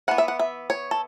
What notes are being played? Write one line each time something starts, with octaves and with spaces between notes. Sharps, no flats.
E3 B3 F#5
E5
F#5
E5
C#5
A4